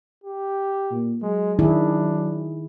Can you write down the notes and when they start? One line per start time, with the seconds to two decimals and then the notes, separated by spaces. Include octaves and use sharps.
0.24 G4
0.91 A#2
1.23 F#3 G#3
1.59 D#3 D4 E4 G#4